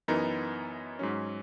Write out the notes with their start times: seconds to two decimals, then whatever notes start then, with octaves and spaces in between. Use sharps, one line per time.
0.08 F#2 E3 B3 D#4 A#4
0.99 G#2 F#3 C#4